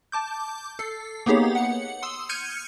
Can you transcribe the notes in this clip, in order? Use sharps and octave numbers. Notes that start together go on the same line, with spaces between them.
A5 D6 G6
A4 C7
A#3 B3 D#4 G4 G#4 C#5
F#5 C#7
C6 D#6 E6
F6 G6 G#6 C#7 D#7